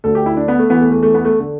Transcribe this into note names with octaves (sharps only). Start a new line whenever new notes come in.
D2 D3 A4
G4
E4
D4
B3
A3
E2 E3 B3
A3
A3
A3
B3
A3
D3